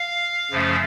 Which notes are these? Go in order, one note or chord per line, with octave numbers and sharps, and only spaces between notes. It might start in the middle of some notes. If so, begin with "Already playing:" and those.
Already playing: F5
F#2 C#3 F3 A3 C#4